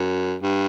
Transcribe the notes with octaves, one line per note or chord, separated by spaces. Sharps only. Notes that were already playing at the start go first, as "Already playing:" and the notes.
Already playing: F#2
G2